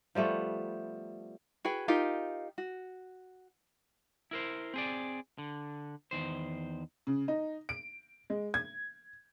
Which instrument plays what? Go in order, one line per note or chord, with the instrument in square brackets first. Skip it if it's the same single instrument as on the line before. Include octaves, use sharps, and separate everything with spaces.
[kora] F3 G3 A3 B3
[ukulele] F#4 G#4 B4 G5
D#4 F4 G4 A#4
F#4
[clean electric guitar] E4 A#4 C5
C4 G#4 D5
D3
E2 D#3 C5
[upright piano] C#3
D#4
D7
G#3
G#6